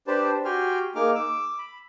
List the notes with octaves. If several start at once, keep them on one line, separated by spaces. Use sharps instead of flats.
D4 G4 B4 C5 A5
F#4 G4 G5 G#5 C6 F6
A#3 D#4 G#4 D6 F6
D6 E6
B5